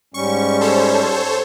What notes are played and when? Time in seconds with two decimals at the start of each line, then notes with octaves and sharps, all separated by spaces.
0.14 G#2 G3 C#4 C#6
0.61 A4 C5 C#5